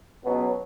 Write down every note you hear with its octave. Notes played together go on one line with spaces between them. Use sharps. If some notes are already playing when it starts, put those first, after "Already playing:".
C#2 B2 F#3 B3